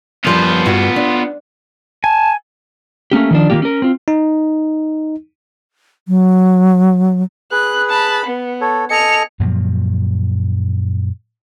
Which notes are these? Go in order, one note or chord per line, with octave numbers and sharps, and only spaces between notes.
F#2 F3 G3 B3 F4
G2 F#4
D4
G#5 A5
A3 A#3 C#4 G4
D#3 F3 D4
D#3 E3 A#3 F4 G4
C#4 A#4
C4 F4
D#4
F#3
G#4 B4 F#6
A5 B5
B3
A4 C#5
A4 D#5 G#5 C#7 F7
F#2 A#2 F3 F#3